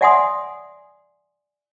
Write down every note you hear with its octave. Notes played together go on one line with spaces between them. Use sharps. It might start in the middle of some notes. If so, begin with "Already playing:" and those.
D5 E5 F#5 G#5 C6 D#6